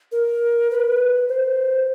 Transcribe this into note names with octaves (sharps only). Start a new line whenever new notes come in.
A#4
B4
C5